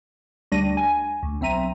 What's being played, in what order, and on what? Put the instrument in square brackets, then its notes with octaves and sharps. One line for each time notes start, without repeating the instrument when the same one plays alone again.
[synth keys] D2 G3 D4 A#6 D#7
G#5
D2
B1 C4 E5 A#5 D#7